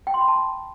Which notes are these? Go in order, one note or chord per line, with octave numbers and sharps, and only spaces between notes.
G5
C6
B5
A5